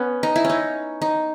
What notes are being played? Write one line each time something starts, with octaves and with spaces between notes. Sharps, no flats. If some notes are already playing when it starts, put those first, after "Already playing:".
Already playing: B3 C#4
D#4
E4
C#4
D#4
D#4